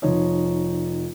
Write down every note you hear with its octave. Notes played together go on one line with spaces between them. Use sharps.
F1 F3 D#4 C#5